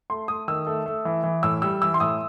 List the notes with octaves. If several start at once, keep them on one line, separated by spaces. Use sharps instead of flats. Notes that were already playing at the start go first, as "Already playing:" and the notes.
A3 C6
A3 D#6
D#3 E6
A3
A3
E3
E3
A2 E6
G3 E6
E3 E6
C6
A2 D#6